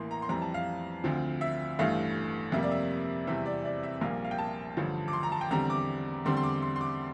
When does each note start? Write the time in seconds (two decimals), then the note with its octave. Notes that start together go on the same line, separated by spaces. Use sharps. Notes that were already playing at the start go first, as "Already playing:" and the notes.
Already playing: A1 A2 E3 A#3 C6
0.11 A#5
0.22 C6
0.29 F2 E3 G3 C4 A#5
0.42 A5
0.54 F5
1.04 D2 D3 F3 C4
1.41 E5
1.79 A1 G2 E3 A3 F5
2.52 F2 C3 G3 A#3 E5
2.63 D5
2.71 E5
3.27 E2 C3 E3 G3 C4 E5
3.46 D5
3.65 D5
3.83 E5
4.01 A#1 A#2 G3 A#3 F5
4.24 F5
4.31 G5
4.38 A5
4.77 A1 G2 D3 F3
5.08 D6
5.13 C6
5.23 A#5
5.32 A5
5.41 G5
5.51 E2 D3 G3 C4 A#5
5.70 D6
6.25 E2 D3 G3 C4 C6
6.37 C6
6.43 D6
6.62 C6
6.76 C6
6.81 D6